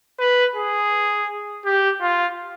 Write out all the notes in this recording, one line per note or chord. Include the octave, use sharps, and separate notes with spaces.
B4
G#4
G4
F4